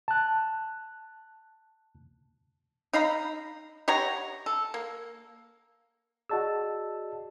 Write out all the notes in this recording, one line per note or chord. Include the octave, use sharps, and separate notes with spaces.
A5 F#6
D#4 F5 A#5 B5
G4 C#5 F#5 A#5
A4
A#3
F#4 G#4 D5 D#5 A5 E6